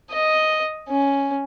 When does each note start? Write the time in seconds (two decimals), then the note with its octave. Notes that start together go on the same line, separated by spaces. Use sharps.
0.12 D#5
0.89 C#4